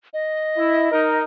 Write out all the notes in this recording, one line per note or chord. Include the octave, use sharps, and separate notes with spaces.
D#5
E4
D#4 A#4